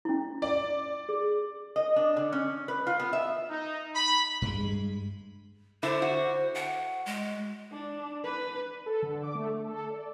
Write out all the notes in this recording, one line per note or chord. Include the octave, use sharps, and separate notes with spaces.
C#4 E4
D5
G#4
D#5
D4
D3
C#4
B4
F4
B3
E5
D#4
B5
G2 G#3
D3 E4 C5
F#4
F#5
G#3
D4
B4
A4
D3
D6
A3
A3
A4
D5